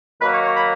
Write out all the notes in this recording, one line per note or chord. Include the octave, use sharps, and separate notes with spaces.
D#3 F#3 A#3 B4
C#5
C#5
B5